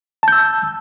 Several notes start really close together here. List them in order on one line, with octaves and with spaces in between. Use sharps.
A5 G6 E6